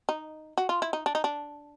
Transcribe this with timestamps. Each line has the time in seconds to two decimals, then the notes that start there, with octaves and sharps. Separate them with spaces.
0.09 D#4
0.58 F#4
0.69 F4
0.82 E4
0.93 D#4
1.06 D4
1.15 D#4
1.24 D4